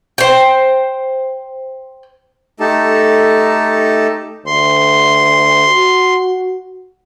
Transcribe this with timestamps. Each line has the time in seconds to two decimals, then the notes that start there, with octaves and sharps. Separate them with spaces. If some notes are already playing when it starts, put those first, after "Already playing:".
0.18 C5 G5
2.60 A3 D#4 G4 A4 A5
4.46 D2 C6
5.68 F#4